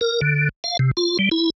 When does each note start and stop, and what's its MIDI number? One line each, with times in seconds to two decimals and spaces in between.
0.01 0.21 70
0.21 0.49 50
0.64 0.77 77
0.79 0.91 48
0.97 1.17 65
1.19 1.29 55
1.31 1.50 64